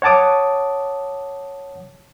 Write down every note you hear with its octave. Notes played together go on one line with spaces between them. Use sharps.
C#5 F#5 A5 D6 D#6